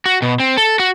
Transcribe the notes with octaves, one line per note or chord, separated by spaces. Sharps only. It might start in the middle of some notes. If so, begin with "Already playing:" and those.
F#4
B2
C4
A4
F#4